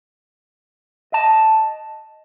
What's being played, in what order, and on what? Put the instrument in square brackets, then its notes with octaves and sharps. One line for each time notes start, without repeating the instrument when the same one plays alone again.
[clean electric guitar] D#5 A5